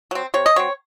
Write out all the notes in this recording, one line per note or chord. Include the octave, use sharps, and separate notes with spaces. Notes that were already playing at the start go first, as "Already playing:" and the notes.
F#3 C4
C3 C#5
D#5
F#3 C4 C#5